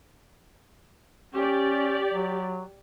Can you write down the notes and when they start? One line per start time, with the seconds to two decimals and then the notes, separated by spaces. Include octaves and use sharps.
1.34 C#4 G4 D5
2.12 F#3